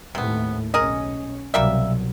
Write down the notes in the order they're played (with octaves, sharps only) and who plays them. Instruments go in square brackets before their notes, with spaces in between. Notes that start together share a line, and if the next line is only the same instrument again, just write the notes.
[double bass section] D#2 A2 A3 [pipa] C3 B3
[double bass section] B1 C#4 [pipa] G#4 A#4 D#5
[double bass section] C2 B2 F#3 [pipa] G3 A#3 E5